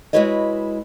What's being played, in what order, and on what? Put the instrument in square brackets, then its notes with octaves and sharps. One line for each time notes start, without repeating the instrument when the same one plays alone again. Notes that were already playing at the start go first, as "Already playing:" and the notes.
[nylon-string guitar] G#3 E4 F#4 B4 C#5 D#5